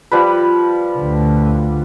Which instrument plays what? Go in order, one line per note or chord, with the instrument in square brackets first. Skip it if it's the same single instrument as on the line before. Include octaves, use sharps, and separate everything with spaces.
[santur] F3 G3 B4
[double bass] D2 D3